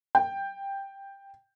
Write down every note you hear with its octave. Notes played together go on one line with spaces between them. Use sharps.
G5